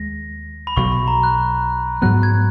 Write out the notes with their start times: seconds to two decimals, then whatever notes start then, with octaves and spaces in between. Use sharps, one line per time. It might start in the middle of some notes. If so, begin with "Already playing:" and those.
Already playing: D#2 G#3 A#6
0.67 B5
0.76 B1 B2 F#3 C#6
0.92 B5
1.07 A#5
1.23 F#6
2.02 G#2 F#3 B3 F#6
2.23 G#6